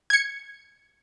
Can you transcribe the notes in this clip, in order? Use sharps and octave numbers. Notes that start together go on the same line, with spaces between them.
G#6 C#7